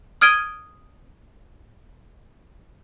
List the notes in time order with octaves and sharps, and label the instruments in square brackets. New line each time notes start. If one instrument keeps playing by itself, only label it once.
[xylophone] D#6 F6 G#6 D7 D#7 G7